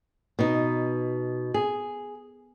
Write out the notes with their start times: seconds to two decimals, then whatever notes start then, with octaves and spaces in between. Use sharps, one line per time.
0.39 B2 D#4
1.54 G#4